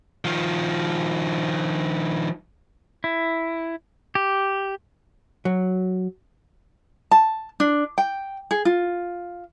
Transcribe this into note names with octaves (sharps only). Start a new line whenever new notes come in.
D#3 F3
E4
G4
F#3
A5
D4
G5
G#4
F4